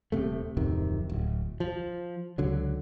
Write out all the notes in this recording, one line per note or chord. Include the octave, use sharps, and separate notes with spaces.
D#1 B1 C3 A3
D1 F2 C3 D#3
D1
F3
C#2 D3 F#3